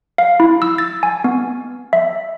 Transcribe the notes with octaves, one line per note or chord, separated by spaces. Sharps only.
F5
E4
E6
A6
G#5
B3
E5